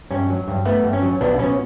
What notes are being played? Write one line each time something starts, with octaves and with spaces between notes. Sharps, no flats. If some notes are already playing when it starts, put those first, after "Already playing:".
G2 C#4
F#3
G2
A3 B3
G2
C#4
F#3
B1 B3 D4
B2 C#4